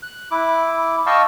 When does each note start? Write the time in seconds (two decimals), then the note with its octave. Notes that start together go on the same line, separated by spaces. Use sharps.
0.03 F#6
0.31 E4 D6
1.06 D#5 F5 G5 A5 C#6 E6